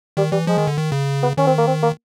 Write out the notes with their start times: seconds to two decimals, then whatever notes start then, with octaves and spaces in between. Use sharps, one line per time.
0.17 D#3 G3
0.32 E3 G3
0.47 F3 G#3
0.58 D#3
0.67 D3
0.77 D#3
0.92 C#3
1.23 B3
1.37 D#3 C#4
1.47 C4
1.58 A#3
1.68 C4
1.83 A#3